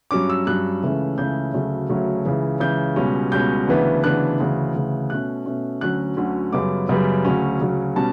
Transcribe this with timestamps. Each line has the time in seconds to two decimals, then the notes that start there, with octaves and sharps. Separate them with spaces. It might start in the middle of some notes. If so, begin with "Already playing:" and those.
0.11 G2 F#3 C#4 D6
0.30 E6
0.47 G2 F#3 C#4 F#6
0.82 C#2 C#3 E3 A3 C#4
1.18 C#2 C#3 E3 A3 C#4 G6
1.54 D2 C#3 F#3 A3 C#4
1.90 D2 C#3 F#3 A3 C#4
2.25 C#2 C#3 E3
2.60 C#2 C#3 E3 G6
2.96 C#2 B2 G3 C#4
3.32 C#2 B2 G3 C#4 G6
3.67 D2 C#3 E3 B3 D4
4.03 D2 C#3 E3 B3 D4 F#6
4.39 D2 C#3 E3
4.74 D2 C#3 E3
5.10 B2 A3 C#4 F#6
5.46 B2 A3 C#4
5.81 D2 D3 F#3 C#4 F#6
6.17 D2 D3 F#3 C#4
6.53 F#2 C#3 G3 B3 D6
6.89 F#2 C#3 G3 B3
7.25 D2 C#3 F#3 C#4
7.60 D2 C#3 F#3 C#4
7.95 B2 G3 C#4 A5